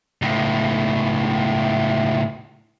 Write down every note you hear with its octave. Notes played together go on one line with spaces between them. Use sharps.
C#2 A2